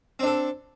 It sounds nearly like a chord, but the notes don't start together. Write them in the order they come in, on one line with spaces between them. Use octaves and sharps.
C4 D4 A4